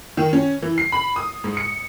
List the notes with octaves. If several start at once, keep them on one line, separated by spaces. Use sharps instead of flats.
D#3
C#4
E3
C7
B5
D#6
G#2
C#7